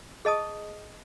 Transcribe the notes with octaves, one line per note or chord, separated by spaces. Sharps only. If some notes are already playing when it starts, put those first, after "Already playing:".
G#4 D#5 A5 D#6